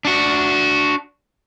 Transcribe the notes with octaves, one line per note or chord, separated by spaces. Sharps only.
D4 F#4